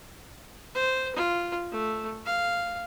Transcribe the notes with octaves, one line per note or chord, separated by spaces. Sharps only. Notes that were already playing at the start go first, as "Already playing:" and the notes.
C5
F4
A3
F5